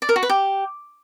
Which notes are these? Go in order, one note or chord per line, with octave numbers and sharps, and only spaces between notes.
D5
A#4
F#4
B4
G4